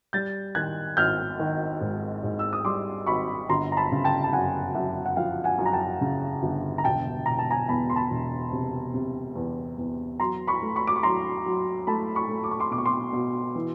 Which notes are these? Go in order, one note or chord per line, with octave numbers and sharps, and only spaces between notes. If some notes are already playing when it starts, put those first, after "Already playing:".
G3 G6 A6
D#3 F#6 G#6
G#1 F6 G6
D#3
G#2
G#2
E6
D#6
G3 C6 D6
G#1 B5 C#6
G1 A#5 C6
A#5
A5 B5
C#3
G5 A5
A5
F#2 F#5 G#5
F#2 E5 F#5
F#5
F3 F5 G5
F#5 G#5
F#2
A#5
G5 A5
C#3
G1
A#5
E1 G5 A5
E1 A#5
A5
G#5 A#5
E2 A5 B5
C6
A5 B5
E1
C3
C3
E2
E2
F#3 A#5 C6
B5 C#6
A3
B5 C#6
D6
C#6
F#3 A#5 C6
F#3
A3 A5 B5
B5 C#6
A3
D6
C#6
C6 D6
B2 D6
C#6
C6 D6
B2
E3